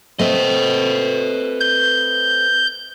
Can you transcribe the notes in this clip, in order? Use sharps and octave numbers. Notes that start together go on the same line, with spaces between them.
A3 C4 B4 D#5
G6